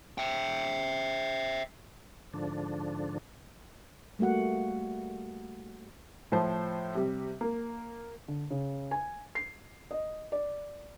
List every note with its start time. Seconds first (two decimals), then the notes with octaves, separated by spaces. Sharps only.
0.18 E5 G5
2.33 G#2 D3 F3 D4
4.19 G3 A3 A#3 F#4 F#5
6.32 A2 F3 C5 A5
6.95 C3 G3
7.41 A#3
8.28 D3
8.51 C#3
8.91 G#5
9.35 C7
9.91 D#5
10.32 D5